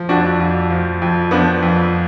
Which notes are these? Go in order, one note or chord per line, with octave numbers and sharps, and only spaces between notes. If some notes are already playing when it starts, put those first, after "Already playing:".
Already playing: F3
F2 D4 F#4
F2
F3
F2
F3 B3 D4
F2